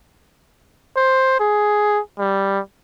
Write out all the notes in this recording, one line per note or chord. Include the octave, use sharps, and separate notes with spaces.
C5
G#4
G3